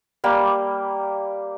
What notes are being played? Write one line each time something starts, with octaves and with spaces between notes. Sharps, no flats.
G3 A#3 G4